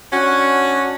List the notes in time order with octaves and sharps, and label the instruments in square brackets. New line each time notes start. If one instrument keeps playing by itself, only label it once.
[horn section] C#4 D4 F#4